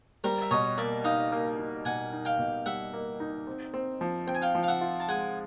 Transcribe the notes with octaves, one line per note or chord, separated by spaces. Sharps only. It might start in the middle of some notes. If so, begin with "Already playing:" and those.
G3 A#4 C5
E5
B2 C#5 D#5
A#3 D5 E5
D#4 D#5 F5
A#3
D#4
B2 F#5 G#5
D#4
F5 G5
B2
G3 E5 F#5
A#3
D#4
C4
C4
F3
C4 G5
G#5
F5 G5
F3
F5
E5 F#5
F4
A5
G#3 F#5 G#5